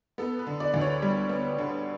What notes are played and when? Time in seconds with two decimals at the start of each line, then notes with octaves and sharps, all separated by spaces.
0.18 B3 A4
0.39 B4
0.47 D3
0.60 D5
0.74 D2
0.81 C#5
1.02 G3
1.29 B3
1.58 D3